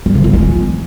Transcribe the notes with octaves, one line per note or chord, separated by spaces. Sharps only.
G3
D3
F4
G#3
E3